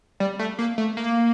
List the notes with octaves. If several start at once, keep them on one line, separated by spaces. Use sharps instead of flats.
G3
A3
A#3
A3
A#3